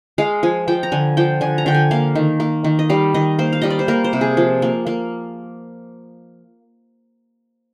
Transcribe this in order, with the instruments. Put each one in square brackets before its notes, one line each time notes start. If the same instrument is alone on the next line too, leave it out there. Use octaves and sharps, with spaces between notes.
[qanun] G#3 F5
F3 G#5
F3 G5
A#5
D3 G#5
F3 G5
D3 G#5
A#5
D3 G5
G#5
A#3 F5
D#3
A#3
D#3
D#5
G3 F5
D#3 D#5
A#3 C5
F5
G3 D#5
D5
C5
A#3 A#4
C5
C3
G#4
F3
A#3
A#3